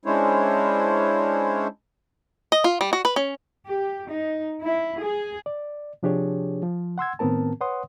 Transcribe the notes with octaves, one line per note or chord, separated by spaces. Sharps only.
G#3 C#4 D4 E4 C5 C#5
D#5
F4
G3
F#4
B4
C#4
G4
D#4
E4
G#4
D5
C3 F3 D4 G4 G#4 C#5
F3
F#5 C6 E6 G#6
A2 D#3 B3 C4 A#4 A5
B4 C#5 F#5 C6 D#6